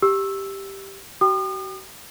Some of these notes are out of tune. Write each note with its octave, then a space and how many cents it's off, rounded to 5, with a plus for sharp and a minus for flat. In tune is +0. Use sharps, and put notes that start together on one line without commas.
G4 +0 E6 +0
F#4 +45 G5 +0 D#6 -40